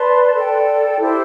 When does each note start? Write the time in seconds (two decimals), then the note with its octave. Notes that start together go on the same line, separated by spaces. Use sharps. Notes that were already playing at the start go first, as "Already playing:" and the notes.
Already playing: B4 D5 A5 C6
0.36 A4 D5 G5
0.98 E4 G4 C5